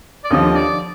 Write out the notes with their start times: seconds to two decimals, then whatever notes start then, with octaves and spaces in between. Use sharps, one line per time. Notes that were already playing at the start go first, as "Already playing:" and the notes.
0.24 D5
0.30 D#2 D3 F3 D#5
0.55 D5